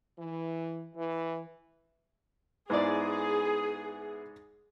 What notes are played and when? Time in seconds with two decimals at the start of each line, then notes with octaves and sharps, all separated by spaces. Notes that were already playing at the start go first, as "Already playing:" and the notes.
0.19 E3
0.95 E3
2.70 G#2 B3 E4 G#4 D5